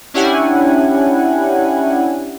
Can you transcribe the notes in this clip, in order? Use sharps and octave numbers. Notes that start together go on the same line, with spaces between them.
C#4 D4 E4 G4 F#5 G#5